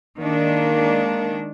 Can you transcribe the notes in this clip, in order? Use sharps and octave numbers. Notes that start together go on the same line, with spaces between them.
D#3 G#3 A#3 D4